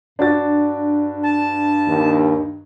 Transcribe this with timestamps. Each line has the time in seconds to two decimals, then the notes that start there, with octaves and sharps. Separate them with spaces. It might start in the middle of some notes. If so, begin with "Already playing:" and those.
0.19 G2 D4 F#4 A6
1.23 A5
1.87 D#2